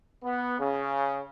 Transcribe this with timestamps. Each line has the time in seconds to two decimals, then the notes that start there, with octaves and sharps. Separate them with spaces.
0.24 B3
0.59 C#3